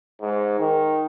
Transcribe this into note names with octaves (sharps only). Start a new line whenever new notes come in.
G#2
D#3